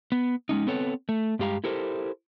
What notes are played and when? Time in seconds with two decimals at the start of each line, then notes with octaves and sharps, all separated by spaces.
0.12 B3
0.49 G#3 C#4 D#4
0.67 B3 C4 A4 B4 C#5
1.09 A3
1.39 G2 G#3 G4 F5 A#5
1.64 E4 G4 A4 A#4 C5